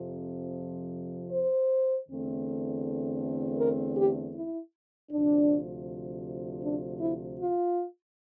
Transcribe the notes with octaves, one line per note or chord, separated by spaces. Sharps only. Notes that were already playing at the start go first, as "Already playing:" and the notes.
Already playing: F2 C3 F3
C5
E2 D3 A3 C4
A#4
G4
E4
D2 C3 F3 D4
D4
E4
F4